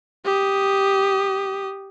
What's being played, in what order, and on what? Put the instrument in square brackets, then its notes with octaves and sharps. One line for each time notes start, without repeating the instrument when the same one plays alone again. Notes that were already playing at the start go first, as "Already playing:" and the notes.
[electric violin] G4 D#6